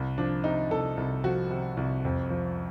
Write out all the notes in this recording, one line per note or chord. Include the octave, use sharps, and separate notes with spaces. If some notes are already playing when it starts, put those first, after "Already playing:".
Already playing: C2
F3 D4
C3 D#4
C2 A4
C2
F3 F#4
C3
C2
F2
F3